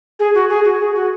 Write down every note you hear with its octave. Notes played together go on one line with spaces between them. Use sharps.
G#4
F#4
G#4
F#4
G#4
F#4